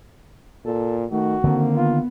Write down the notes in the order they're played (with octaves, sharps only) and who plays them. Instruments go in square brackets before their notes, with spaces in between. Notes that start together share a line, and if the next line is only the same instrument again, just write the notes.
[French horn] A#2 [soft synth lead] A4
[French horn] D#3 [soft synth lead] A3 [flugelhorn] F#4
[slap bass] D3 D#3 [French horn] A#3 [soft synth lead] C4
[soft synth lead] B3 [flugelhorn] F4